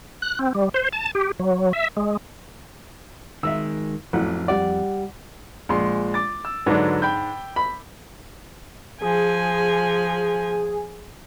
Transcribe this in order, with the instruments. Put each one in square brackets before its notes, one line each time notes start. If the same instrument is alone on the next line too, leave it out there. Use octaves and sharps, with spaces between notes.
[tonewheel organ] F#6
C4
G3
C5
A5
G4
F#3
E5
G#3
[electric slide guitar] D#3 G#3 [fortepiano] E5 E6
[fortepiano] A1 F#3 F#5 [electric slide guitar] F2
[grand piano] G3 F#5 [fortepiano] D5
[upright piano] A#1 G#3 C6
D6 A6
E6
[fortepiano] G#2 D4 [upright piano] D3 F#3 B4
[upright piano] G5 B5 G6
[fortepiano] B5
[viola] F3 G#5 [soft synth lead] G#4